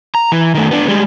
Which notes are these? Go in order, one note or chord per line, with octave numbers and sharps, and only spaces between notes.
A#5
E3
D#3 A3
B3 D4
G3 G#3